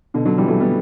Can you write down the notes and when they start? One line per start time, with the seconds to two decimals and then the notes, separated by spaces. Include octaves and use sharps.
0.14 B2 D3
0.25 D3 F#3
0.38 E3 G3
0.48 F#3 A3
0.60 G3 B3